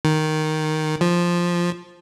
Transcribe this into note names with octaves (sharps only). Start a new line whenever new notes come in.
D#3
F3